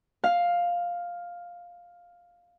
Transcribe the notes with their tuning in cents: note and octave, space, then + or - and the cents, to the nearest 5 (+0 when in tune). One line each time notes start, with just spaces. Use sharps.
F5 +5